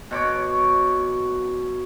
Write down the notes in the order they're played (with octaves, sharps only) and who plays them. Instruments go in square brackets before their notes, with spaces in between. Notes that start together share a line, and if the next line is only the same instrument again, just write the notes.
[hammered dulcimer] B2 C#5 D6